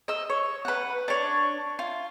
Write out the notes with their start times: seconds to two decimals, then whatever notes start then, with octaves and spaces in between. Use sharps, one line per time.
0.08 D#5 E6
0.30 C#5
0.65 B4 F#5
1.08 D4 C#5
1.79 F4